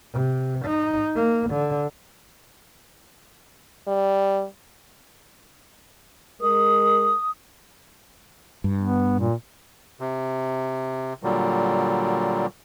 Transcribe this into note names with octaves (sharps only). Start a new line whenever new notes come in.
C3
D#4
A#3
D3
G3
G#3 A#4 D#6
G2
B3
A#2
C3
A#2 D3 F#3 G3